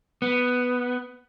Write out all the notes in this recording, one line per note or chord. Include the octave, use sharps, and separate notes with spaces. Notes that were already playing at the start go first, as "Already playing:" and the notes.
B3